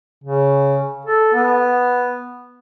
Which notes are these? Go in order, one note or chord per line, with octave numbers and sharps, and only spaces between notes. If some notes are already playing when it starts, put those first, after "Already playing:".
C#3
A4
B3